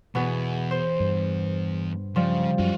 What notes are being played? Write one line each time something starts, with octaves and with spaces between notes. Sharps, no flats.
E2 B2 B3 G#4
C5
G2
C#3 F3 G3
F#2 F4 F#4